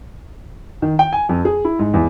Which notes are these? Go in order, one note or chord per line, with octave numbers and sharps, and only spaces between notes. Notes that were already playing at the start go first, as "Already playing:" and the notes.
D#3
G5
G#5
F2
G#4
E4
G#2
E2